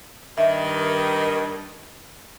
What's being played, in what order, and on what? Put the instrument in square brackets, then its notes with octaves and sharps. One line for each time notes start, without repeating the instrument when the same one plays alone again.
[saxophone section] G2 D#3 [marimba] E5